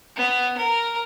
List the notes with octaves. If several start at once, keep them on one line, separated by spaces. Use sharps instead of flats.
B3
A#4